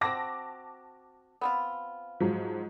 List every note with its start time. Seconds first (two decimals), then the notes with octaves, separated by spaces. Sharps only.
0.01 C4 F#4 A5 D6 A#6
1.41 B3 C4 F4
2.20 G#2 F3 F#3